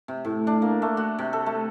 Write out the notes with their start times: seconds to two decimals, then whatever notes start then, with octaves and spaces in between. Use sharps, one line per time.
0.08 C3
0.25 A2
0.47 D4
0.62 A#3
0.82 A3
0.97 F#4
1.18 C3
1.33 A4
1.46 A3